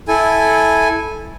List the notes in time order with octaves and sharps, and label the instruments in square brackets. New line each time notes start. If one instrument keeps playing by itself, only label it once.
[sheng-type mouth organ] E4 A4 G#5